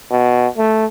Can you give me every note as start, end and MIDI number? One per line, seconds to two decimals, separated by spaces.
0.11 0.48 47
0.57 0.86 57